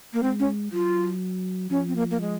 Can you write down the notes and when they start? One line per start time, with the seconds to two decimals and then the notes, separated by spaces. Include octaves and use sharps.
0.13 A#3
0.22 G#3 C4
0.39 C#4
0.72 F#3 F4
1.70 F3 C#4
1.88 C4
1.96 A#3
2.11 A#3
2.21 G#3